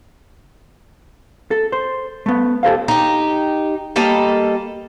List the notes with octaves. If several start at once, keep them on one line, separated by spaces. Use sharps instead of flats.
A4
C5
A3 B3
G4 A4 C5 F5
D#4 G4
G3 A#3 A4 D#5